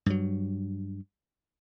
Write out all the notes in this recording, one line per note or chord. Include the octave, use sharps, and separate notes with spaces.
G2 F#3